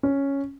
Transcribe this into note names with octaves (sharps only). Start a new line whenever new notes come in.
C#4